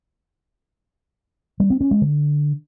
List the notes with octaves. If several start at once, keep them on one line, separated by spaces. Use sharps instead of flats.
G3
C4
C#4
G#3
D3